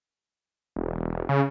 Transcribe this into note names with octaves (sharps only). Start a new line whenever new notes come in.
E1
C#3